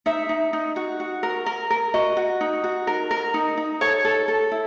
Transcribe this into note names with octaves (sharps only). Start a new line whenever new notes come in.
D#4 E5
D#4
D#4
F#4
F#4
A#4
A#4
A#4
F#4 D#5
F#4
D#4
F#4
A#4
A#4
D#4
D#4
A4 C#5
A4
A4
E4